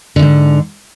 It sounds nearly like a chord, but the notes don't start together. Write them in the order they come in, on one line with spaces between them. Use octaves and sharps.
D3 E2 G#2